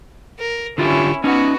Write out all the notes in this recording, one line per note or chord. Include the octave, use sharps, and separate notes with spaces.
A#4
D3 C#4 E4 F4 G4
B3 C#4 D#4 F#4